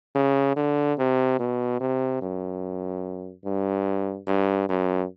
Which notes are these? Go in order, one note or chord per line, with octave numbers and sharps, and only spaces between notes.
C#3
D3
C3
B2
C3
F#2
G2
G2
F#2